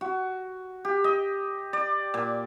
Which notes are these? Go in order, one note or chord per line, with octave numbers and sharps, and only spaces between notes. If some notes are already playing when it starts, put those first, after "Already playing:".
F#4
G4
D#5
D5
A#2